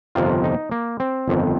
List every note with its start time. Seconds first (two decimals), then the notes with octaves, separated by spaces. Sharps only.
0.15 G1 F2 C3 D#3 F4
0.44 D#4
0.71 A#3
1.00 C4
1.28 G1 F2 D#3